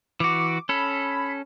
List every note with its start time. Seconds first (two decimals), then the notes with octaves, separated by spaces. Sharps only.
0.20 E3 F#4 D6
0.69 C#4 A4 B5